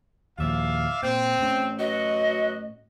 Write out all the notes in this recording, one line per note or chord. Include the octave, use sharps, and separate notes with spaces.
D#2 A#2 F3 D5 E5 F5
A#2 C4
A2 C#4
F#3 B3 F#4 D#5